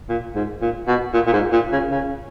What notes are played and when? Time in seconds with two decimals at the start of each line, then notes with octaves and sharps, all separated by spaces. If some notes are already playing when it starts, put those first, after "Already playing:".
0.09 A#2
0.35 G#2
0.61 A#2
0.87 B2
1.14 A#2
1.26 A#2
1.33 G#2
1.52 A#2
1.72 C#3
1.91 C#3